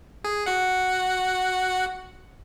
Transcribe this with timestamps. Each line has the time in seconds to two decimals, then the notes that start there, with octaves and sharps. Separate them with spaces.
0.24 G#4
0.46 F#4 F#5